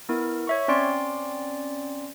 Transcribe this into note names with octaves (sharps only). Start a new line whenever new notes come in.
B3 E4 A#4
C#5 E5 C#6
C4 C#4 D5 C6 D7